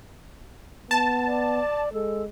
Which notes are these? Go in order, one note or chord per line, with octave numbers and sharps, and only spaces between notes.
B3 A5
D5
G#3 A4